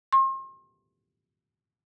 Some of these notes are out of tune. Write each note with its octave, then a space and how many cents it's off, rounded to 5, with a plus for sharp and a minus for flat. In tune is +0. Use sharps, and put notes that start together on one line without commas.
C6 +40